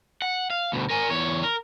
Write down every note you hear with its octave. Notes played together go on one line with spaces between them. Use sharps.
F#5
F5
D2 B2
A#4 G#5
E2 C#5
A#4